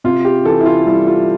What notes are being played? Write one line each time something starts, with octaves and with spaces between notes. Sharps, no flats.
C3 F4
G4
E3 A4
E4
F4
G3 E4
F4